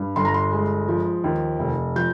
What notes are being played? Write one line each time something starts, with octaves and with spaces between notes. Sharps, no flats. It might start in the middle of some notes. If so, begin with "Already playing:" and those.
Already playing: G2
G1 C6
A#5
C6
G#3
F3
D#2
F1
F3 G6